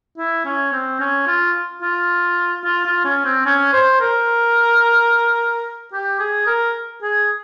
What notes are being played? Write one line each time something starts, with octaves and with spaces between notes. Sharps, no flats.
E4
C#4
C4
C#4
F4
F4
F4
F4
C#4
C4
C#4
C5
A#4
G4
G#4
A#4
G#4